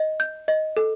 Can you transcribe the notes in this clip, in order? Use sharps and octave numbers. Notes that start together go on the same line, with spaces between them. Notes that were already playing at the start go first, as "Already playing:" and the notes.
Already playing: D#5
G6
D#5
A4